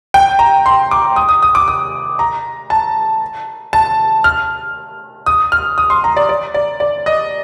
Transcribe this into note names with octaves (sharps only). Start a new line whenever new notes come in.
G5
A#5
C6
D6
D#6
D#6
D#6
D6
D#6
A#5
A5
A5
F6
D#6
F6
D#6
C6
A#5
D5
D5
D5
D5
D#5